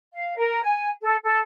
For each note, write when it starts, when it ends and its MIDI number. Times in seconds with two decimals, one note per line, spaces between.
0.11 0.35 77
0.36 0.61 70
0.62 0.88 80
1.01 1.15 69
1.24 1.38 69